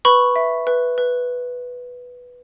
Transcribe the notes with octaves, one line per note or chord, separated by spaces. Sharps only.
B4 B5 C#6
E5
B4
B4